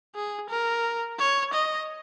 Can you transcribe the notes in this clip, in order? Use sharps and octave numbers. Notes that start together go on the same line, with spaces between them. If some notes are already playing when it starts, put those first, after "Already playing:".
G#4
A#4
C#5
D#5